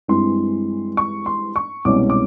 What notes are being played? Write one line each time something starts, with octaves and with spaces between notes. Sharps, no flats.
G2 E3 G#3 C4 C6
C#6
C6
C#6
C2 B2 G#3 C#4 D6
D6